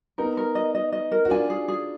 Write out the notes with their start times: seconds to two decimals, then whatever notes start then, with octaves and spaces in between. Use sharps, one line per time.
0.18 B3 D#4 A#4
0.37 A#4
0.55 D#5
0.75 D#5
0.92 D#5
1.12 A#4
1.25 F#4
1.30 D4 F4 G#5
1.50 G#4
1.68 G#4